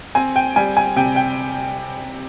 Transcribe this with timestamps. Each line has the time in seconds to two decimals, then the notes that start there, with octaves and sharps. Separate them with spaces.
0.15 C4 G#5
0.36 G5
0.56 G3 G#5
0.77 G#5
0.96 C3 G5
1.16 G5